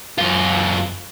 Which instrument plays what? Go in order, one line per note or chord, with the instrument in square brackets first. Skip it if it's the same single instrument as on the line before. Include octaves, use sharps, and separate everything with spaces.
[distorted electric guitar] F#2 F4